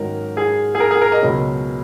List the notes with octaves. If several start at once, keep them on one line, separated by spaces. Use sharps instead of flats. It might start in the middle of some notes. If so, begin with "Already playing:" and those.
Already playing: G#2 D#3 F#3 C#4 A#4
G#4
G#4
A#4
G#4
A#4
D#5
C#2 B2 F#3 C#4